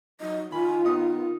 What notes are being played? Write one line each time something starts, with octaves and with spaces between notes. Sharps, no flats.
F#3 D#4 D#5
D#3 F4 G#5 B5
B3 D#4 D#6